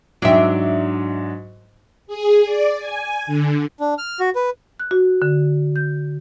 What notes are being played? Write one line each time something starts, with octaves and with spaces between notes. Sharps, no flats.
G#2 F#3 D4 E5
G#4
D5
G#5
D3
D4
F6
F#4
B4
F#6
F#4
D3
G6